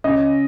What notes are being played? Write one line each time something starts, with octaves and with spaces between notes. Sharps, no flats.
C#3 D#5